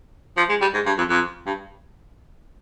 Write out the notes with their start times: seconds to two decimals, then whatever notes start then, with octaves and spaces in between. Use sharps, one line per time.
0.37 F3
0.49 G#3
0.61 G3
0.74 G#2
0.86 G2
0.98 F2
1.09 F2
1.46 G2